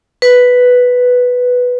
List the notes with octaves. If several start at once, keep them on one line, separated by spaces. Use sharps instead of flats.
B4